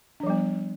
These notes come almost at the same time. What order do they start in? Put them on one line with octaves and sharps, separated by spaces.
D4 F3 G3 B3